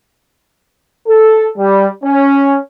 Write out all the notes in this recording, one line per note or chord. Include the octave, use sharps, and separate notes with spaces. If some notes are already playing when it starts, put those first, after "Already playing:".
A4
G3
C#4